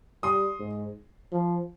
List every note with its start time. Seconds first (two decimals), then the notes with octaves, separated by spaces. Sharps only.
0.23 G3 C6 D#6
0.60 G#2
1.32 F3